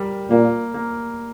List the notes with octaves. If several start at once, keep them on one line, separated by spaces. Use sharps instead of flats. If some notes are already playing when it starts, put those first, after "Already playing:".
Already playing: G3 A#4
A#2 A#3
A#3